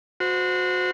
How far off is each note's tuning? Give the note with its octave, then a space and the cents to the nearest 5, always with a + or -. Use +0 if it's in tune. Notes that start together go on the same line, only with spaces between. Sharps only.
F#4 -25 C5 -20